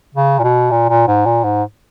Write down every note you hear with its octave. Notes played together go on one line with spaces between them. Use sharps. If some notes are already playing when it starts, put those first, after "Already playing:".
C#3
A#2
B2
A#2
A#2
G#2
A#2
G#2